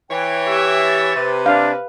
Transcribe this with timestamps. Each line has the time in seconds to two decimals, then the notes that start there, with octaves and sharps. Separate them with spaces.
0.10 E3 C#5 G5
0.46 G4 E5
0.85 A6
1.16 C3 B4
1.46 D4 F5